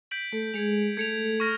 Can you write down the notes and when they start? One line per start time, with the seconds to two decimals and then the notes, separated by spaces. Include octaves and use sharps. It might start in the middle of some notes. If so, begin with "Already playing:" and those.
0.11 G6 B6 D7 F#7
0.32 A3 A4
0.54 G#3 G#4 G#6 C#7 F7
0.97 A3 A4 G#6 C#7 F7
1.40 C#6 F6 A#6